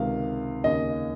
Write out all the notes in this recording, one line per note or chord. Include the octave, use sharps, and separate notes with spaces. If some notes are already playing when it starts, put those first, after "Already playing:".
Already playing: C#2 C3 D#3 F5
D#2 C#3 D#5